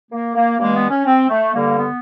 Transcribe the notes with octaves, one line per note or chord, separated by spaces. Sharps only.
A#3
A#3
G2 E3 G#3 A#3
B3
C#4
C4
A3
G2 D3 G3 A#3
B3